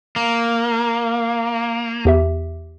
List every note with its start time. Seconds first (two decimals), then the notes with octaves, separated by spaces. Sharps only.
0.16 A#3
2.05 E2 G4 E5